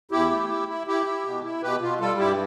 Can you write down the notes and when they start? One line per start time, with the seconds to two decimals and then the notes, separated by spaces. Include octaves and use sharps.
0.11 E2 E4 G4
0.31 A3
0.49 E4
0.68 E4
0.87 E4 G4
1.06 E4
1.25 B2
1.44 E4
1.62 B2 G4 B4
1.81 B2 F4
2.00 G3 F4 A4
2.19 G2 E4 G4